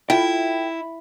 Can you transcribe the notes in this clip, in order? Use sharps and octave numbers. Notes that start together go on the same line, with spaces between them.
E4 F4 A4 G5